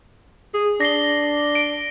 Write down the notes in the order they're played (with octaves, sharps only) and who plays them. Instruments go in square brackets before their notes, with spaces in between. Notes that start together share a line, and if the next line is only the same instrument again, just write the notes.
[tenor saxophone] G#4
[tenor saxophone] D4 [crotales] A#6 C7 G7
[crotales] D7